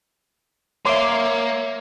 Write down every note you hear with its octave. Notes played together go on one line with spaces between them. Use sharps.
A#3 C#5 E5 C6 D6